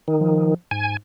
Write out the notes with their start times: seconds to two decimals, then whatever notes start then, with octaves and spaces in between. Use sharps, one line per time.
0.08 D#3
0.21 F3
0.71 G#2 G#5